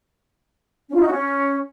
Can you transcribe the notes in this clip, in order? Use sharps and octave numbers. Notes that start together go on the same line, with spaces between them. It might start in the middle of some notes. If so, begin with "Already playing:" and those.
C#4
F4
D#4
F#4
C#4